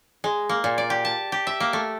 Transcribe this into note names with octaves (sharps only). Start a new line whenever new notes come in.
G#3
A#3
A#2
D5
G4
A5
G4
E5
A#3
A3